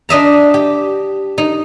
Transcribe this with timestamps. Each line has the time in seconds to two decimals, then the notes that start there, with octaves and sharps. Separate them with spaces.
0.09 D4 D#5 E5 A#5
0.54 G4
1.38 D#4